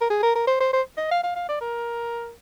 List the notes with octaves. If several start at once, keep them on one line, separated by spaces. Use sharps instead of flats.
A#4
G#4
A#4
A#4
C5
C5
C5
D#5
F5
F5
F5
D5
A#4